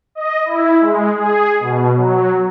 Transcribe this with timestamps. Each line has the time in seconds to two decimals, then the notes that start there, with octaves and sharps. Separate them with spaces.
0.15 D#5
0.45 E4
0.81 G#3
1.15 G#4
1.60 B2
1.96 F#3